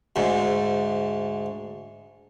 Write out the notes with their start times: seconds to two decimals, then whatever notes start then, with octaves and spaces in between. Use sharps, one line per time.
0.16 D2 G#2